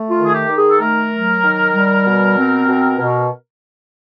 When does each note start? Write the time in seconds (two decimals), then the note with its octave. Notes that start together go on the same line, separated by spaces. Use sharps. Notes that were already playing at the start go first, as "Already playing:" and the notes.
Already playing: A3
0.10 F4
0.18 D#3
0.26 G#4
0.34 G4
0.49 D#3
0.57 G#4
0.70 A4
0.81 A3 A#4
1.12 F#3
1.43 D#3
1.74 G3
2.06 B2
2.38 C4
2.68 B2
2.99 B2